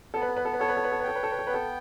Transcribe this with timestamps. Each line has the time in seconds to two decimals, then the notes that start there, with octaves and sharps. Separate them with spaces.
0.14 B3 A4
0.22 B4
0.29 A4
0.37 B4
0.45 A4
0.53 B4
0.59 A4 C#5
0.69 B4
0.77 A4
0.84 B4
0.92 A4
1.00 B4
1.03 A4 G5
1.15 B4
1.23 A4
1.31 B4
1.39 A4
1.47 B3 B4
1.54 A4